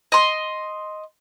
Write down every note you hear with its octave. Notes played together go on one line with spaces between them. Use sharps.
D#5 C6